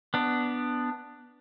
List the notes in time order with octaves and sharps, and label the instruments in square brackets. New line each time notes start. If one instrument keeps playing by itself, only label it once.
[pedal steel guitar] B3 D4